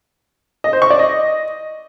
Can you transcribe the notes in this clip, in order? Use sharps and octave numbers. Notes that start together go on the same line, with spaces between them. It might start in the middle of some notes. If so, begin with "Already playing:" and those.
D#5
C5
C#6
D5
D#5